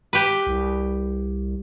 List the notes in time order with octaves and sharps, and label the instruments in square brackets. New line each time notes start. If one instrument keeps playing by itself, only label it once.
[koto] G4 B4
[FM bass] C2